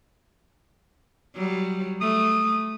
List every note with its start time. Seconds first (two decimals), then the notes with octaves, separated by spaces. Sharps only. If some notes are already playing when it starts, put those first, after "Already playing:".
1.35 F#3 G3
2.01 A3 D#6